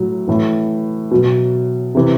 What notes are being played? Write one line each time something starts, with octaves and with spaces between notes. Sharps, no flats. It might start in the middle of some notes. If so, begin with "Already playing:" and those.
Already playing: A2 F#3
A2 E3
B2 F#3
C3 E3